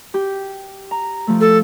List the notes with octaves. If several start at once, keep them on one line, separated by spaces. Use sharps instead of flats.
G4
A#5
F3 A3
A4